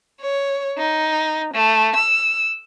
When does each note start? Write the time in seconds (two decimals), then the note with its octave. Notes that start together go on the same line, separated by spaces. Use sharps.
0.21 C#5
0.78 D#4
1.54 A3
1.96 E6